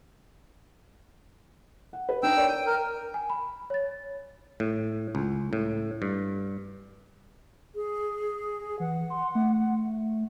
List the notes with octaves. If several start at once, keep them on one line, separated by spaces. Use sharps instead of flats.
F#5
B4
D4 D#4 G5 E6
A#4 C#5 D5
G5 D#7
A#4
G#5
B5
C#5 A6
A2
C#2
A2
G2
G#4
E3 F#5
C6
A3